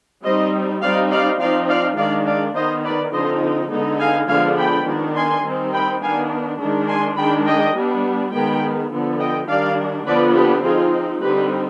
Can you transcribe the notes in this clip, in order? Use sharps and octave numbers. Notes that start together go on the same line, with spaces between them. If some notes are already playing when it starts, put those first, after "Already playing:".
G3 C4 D#4 C5 D#5
G3 C4 D#4 D5 F5
D5 F5
F3 C4 D#4 D5 F5
D5 F5
D#3 G#3 D4 D5 F5
D5 F5
D#3 B3 D#4 C5 D#5
B4 D5
D3 F3 C4 D#4 C5 D#5
D3 G#3 B3 D#4
F5 G#5
D3 F3 G#3 B3 D4 F5 G#5
G5 B5
D#3 B3 D4
G#5 C6
D#3 G3 C4 D#4
G5 B5
D#3 B3 D4 F5 G#5
D#3 G#3 D4
G#5 C6
D#3 G#3 D4 G5 B5
D#5 G5
G3 B3 D4
D#3 G#3 B3 G5 B5
D3 F3 B3
D#5 G5
D#3 G3 D4 D5 F5
D3 F3 B3 D4 B4 D5
G4 B4
F3 C4 D#4 F4 G#4
D3 G3 C4 D#4 G4 B4